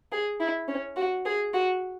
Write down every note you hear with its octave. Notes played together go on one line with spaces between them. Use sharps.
G#4
E4
C#4
F#4
G#4
F#4